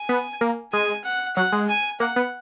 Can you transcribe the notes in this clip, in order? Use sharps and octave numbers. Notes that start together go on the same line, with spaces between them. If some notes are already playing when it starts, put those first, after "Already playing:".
Already playing: G#5
B3
A#3
G#3 G#5
F#5
F#3 F#5
G#3
G#5
A#3 F#5
B3